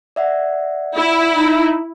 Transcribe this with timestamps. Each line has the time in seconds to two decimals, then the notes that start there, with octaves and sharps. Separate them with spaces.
0.16 D5 E5 F#5
0.96 E4
1.36 D#4